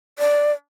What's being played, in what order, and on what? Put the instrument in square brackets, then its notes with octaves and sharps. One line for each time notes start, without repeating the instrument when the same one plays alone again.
[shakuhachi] D5